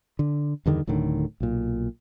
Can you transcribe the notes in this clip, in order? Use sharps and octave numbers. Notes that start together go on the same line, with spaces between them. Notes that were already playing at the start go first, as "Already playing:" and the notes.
D3
E2 G2 D3 D#3
D1 A2 D3 D#3
B1 A#2